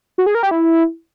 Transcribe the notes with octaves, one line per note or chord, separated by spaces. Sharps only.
F#4
G#4
A#4
G4
E4